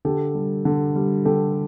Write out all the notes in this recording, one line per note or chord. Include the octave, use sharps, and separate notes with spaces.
D3 G4 A4
G3
D3
G3
D3 G4 A4